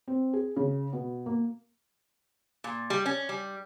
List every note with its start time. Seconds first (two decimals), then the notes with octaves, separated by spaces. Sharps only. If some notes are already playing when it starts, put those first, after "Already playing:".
0.08 C4
0.33 G#4
0.56 C#3
0.93 B2
1.26 A#3
2.64 A#2
2.90 G3
3.06 C#4
3.29 G3